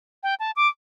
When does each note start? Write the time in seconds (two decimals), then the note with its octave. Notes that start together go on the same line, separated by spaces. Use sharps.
0.23 G5
0.40 A5
0.56 D6